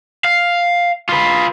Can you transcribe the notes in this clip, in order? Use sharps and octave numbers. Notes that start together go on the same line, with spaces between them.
F5
F4 B4